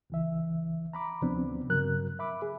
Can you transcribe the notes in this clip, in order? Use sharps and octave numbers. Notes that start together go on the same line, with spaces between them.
C#2 E3 E5
A#5 B5 D6
D2 C3 F3 B3 C4 D4
G2 C#3 F#3 A#4 F#6
E5 B5 D6
G#4